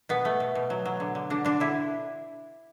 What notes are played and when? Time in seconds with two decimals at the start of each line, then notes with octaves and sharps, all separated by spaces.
0.09 B2 B3
0.25 A3
0.40 B2
0.55 B2
0.70 F#3
0.85 F#3
1.00 D3
1.15 D3
1.30 D3 D4
1.45 D3 D4
1.60 D3 E4